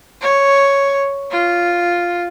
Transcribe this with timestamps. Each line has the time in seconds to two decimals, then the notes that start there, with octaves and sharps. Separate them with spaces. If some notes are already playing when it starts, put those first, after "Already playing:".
0.21 C#5
1.31 F4